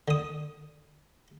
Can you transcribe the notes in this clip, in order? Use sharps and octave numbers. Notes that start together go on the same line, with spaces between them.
D3 D#6